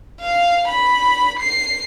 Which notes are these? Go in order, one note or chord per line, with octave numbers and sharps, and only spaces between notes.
F5
B5
C7